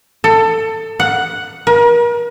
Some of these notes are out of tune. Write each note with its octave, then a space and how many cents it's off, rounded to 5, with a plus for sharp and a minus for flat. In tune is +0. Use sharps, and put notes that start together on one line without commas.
A4 +20
F#5 +0
A#4 +40